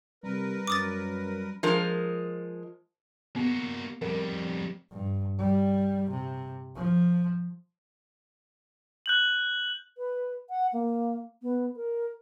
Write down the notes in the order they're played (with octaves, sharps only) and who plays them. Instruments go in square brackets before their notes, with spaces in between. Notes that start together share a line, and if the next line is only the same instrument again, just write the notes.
[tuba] C3 [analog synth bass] G3 [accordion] A#4 B4
[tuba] F#2 [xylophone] D6 D#6 A6
[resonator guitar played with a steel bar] F3 G#3 A#4
[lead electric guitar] A#3 F#4 [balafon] B3
[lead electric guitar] F2 G3 [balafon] A#4
[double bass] G2
G3
C3
F3
[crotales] F#6 G6 F#7
[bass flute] B4
F#5
A#3
B3
A#4